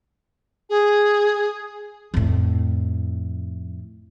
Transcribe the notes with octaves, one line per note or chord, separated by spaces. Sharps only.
G#4
F2 A2